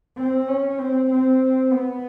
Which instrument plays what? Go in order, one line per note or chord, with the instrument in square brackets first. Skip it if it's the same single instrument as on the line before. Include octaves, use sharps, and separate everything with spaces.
[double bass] C4
C#4
C4
C4
B3